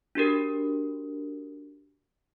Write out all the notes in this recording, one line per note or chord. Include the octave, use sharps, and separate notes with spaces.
D4 F#4 G4 A#4